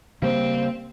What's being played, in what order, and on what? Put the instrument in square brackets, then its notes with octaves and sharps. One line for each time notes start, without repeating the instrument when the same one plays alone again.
[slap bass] C#3 G3 A#3 [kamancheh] C4